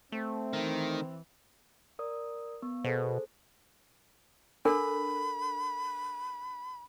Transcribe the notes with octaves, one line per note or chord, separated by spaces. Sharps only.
A3 C4
D#3 E3
A#4 D5 D#6
B3
B2 G#4 A4 C5
D4 A4 A#4 B5